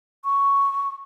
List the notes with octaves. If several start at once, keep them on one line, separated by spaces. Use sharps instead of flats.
C#6